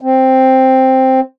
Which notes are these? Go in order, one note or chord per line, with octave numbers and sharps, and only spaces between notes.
C4